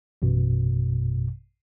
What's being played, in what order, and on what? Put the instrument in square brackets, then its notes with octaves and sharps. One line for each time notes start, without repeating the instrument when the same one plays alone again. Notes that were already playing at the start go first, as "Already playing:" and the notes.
[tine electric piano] A1 F#2 B2